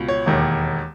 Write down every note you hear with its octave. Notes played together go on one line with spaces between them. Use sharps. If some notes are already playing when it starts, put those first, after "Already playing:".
Already playing: C#2 B2
C#5
E1 D#2 D#3